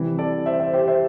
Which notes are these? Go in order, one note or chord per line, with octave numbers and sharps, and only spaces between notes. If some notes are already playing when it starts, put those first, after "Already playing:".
Already playing: C3 E3 G3
A4 D5
C5 E5
C5 E5
G4 C5
C5 E5